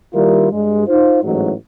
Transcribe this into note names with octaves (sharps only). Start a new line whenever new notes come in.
D#3 G3 A#3 E4 F4 A#4
G2 G#3
D#4 F4 C5
A1 G#2 F#3